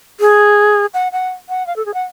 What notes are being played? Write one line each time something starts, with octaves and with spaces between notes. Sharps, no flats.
G#4
F#5
F#5
F#5
F5
A4
G#4
F#5